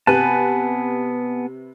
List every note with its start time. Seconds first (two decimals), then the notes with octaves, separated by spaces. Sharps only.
0.07 C3 B3 B4 G#5 A5 F#6